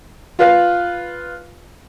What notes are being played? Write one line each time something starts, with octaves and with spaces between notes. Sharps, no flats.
F4 B4 F5